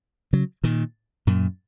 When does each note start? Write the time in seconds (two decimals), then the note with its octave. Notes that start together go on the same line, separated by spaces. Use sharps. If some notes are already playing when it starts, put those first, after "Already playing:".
0.33 C#3 F#3
0.64 A#2 D#3
1.27 F#2 A#2